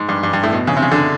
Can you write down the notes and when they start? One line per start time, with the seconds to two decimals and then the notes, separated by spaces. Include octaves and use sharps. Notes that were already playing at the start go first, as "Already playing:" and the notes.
Already playing: G#2
0.09 G2
0.23 G2
0.33 G2
0.43 A2
0.53 B2
0.67 C#3
0.77 C3
0.82 C#3
0.92 D3